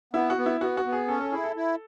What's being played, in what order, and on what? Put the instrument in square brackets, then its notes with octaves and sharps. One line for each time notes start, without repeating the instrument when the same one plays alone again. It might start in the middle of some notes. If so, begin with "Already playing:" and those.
[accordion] B3 [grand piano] E4
[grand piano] F#4
[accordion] B3
[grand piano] E4
[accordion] B3 [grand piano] F#4
[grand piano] F#4
[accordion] B3
[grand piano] G#4
[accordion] C#4 [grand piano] A4
[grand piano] A4
[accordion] E4 [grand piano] G#4
[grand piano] A4
[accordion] E4